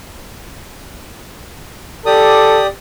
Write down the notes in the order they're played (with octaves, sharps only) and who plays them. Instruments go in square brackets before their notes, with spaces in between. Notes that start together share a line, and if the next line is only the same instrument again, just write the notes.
[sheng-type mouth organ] G4 D5 D#6 [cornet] A4